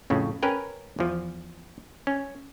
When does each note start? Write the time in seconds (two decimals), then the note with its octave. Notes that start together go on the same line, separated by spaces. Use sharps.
0.10 F2 A2 C#3
0.43 C#4 A#4 B4 G5
0.99 E2 F3
2.07 C#4